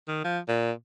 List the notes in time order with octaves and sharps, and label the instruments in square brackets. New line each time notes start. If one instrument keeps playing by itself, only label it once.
[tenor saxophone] D#3
F3
A#2